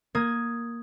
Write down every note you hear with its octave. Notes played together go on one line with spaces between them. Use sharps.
A#3 D#6 G#6